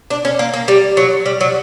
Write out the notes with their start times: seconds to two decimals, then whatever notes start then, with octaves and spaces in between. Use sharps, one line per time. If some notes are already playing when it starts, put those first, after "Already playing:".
0.10 D4
0.25 C#4
0.39 A#3
0.53 A#3
0.68 G3
0.97 F#3
1.26 G3
1.41 F#3